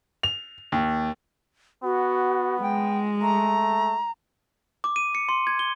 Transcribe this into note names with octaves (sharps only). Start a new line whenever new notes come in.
F7
D#2
B3 F#4
G#3 G5
A3 A#5
D6
D#7
C#7
C6
G#6
G7